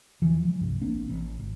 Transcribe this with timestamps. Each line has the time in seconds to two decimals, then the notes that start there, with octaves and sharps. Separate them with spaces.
0.22 E2 E3 F3
0.45 F3 G3
0.59 D#1 C2 G2
0.81 A1 A#3 C4 D4
1.09 A1
1.40 G#1